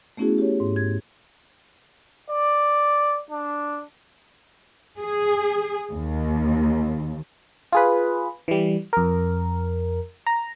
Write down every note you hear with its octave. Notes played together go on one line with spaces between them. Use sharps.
A3 B3 C#4 E4 F#4 G#4
G4 C#5
G#2
G#6
D5
D4
G#4
D#2
F4 G#4 B4
E3 G3
F2 A#4
A#5